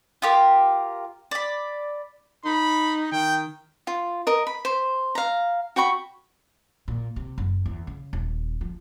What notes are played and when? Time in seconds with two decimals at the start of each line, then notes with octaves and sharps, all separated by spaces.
0.22 F4 G4 A#4
1.31 D5 B5
2.45 D#4 B5
3.12 D#3 G5
3.87 F4
4.27 A#4 D#5
4.47 B5
4.65 C5
5.15 F5 A#5
5.76 F#4 G5 B5 C#6
6.88 A#2
7.16 C3
7.38 F#1
7.66 E2
7.87 C#3
8.13 D#1
8.61 F3